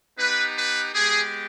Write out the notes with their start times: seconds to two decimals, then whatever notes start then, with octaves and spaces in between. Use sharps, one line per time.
0.17 B3 D#4 G4 B4
0.55 B4
0.93 G#3 B3 G4 G#4